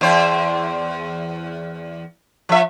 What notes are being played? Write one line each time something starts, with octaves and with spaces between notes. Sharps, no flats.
E2 C5
F3 E5